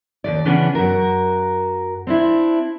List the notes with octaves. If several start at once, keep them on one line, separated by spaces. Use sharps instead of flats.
D#2 B2 D5
C#3 E3 B3 C#4 D4
F#2 F#4 A#4
C4 D4 E4